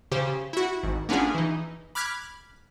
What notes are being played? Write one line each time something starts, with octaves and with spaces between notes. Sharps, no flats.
C#3 G4 C5
E4 F#4
G#1
A#3 B3 C#4 D4 F4 G#4
E3 D#4
B5 D6 F6 F#6 G#6 B6